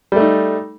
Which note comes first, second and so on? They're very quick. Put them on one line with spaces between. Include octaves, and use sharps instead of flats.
G3 A3 D#4